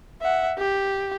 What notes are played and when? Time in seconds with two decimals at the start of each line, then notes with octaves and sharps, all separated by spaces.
0.22 E5 F#5
0.59 G4